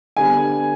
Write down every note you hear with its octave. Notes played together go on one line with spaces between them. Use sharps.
D3 G3 B3 G#5